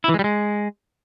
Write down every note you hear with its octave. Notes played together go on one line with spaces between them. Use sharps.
E4
E3
G#3
G3
G#3